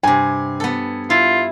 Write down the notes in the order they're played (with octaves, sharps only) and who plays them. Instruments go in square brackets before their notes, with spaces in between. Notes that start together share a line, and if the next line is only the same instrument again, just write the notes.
[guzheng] G2 C3 [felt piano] G#5
[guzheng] B3 A4
[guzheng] E4 [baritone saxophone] F4